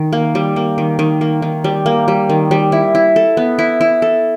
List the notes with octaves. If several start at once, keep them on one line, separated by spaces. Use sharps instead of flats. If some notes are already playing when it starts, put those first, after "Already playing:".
Already playing: D#3
A#3
G3
A#3
D#3
D#3
A#3
D#3
G3
A#3
G3
D#3
G3
E4
E4
A4
B3
E4
E4
A4